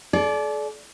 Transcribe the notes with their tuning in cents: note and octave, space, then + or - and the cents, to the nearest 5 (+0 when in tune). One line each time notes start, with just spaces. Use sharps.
A4 -45 D5 -10